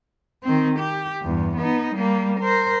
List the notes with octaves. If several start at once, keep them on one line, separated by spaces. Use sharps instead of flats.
D#3 C4
G4
E2 G2
B3 D#4
G3 A#3
A#4 C5